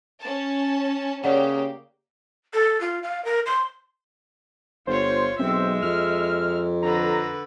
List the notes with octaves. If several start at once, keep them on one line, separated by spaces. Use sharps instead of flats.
C#4 A5
C#3 A#3 G4 C#5 D5 F#5
A4
F4
F5
A#4
C6
G1 F4 C5 C#5
B1 G#3 C4 E5
F2 F6
D3 B4 A#5